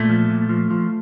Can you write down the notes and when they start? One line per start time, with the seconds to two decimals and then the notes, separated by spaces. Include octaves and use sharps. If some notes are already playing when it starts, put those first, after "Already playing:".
Already playing: A#2 A3
0.09 F3
0.30 A#2
0.49 F3
0.70 F3